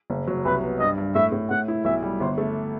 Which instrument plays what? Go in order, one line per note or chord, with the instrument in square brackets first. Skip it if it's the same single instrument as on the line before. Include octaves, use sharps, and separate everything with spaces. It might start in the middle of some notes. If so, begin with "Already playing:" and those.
[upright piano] F#1
F#3
[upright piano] C2 [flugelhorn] B4
[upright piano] B3
[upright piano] G2 [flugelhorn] D#5
[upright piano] G2
[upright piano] A2 [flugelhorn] E5
[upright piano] A2
[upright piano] A2 [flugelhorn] F#5
[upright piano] E4
[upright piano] B1 [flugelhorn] E5
[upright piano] G3
[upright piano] G1 [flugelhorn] C5
[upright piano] A3